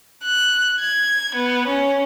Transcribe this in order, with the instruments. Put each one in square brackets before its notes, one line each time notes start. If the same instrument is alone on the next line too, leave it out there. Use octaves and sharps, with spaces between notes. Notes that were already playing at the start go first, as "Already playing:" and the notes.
[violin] F#6
G#6
B3
C#4